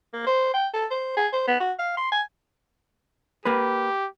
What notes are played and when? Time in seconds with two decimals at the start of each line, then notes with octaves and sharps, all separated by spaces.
0.13 A#3
0.27 C5
0.54 G5
0.73 A4
0.91 C5
1.17 G#4
1.33 C5
1.47 B3
1.60 F#4
1.79 F5
1.97 C6
2.12 G#5
3.45 A#3 G4 B4